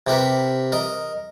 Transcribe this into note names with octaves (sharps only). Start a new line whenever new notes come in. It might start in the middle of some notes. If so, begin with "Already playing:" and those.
C3 G4 A#4 B4
A#4 D#5